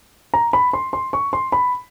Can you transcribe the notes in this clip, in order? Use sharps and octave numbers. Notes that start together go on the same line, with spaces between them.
A#5
B5
C6
C6
C#6
C6
B5